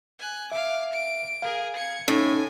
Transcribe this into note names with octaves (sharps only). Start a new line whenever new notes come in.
G#5 F#6
E5 F5 D6
D7
G#4 A#4 F5
G#6 C#7
A2 C#4 D#4 G#5